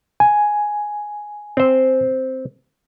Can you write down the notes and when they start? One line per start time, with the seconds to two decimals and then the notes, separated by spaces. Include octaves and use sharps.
0.20 G#5
1.57 C4 C5